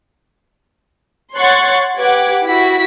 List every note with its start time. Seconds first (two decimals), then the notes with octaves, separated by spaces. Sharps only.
1.37 C#5 F#5 C6 C#6 F#6 A6
1.97 G4 B4 F#5 D6 G#6
2.43 E4 F#4 B6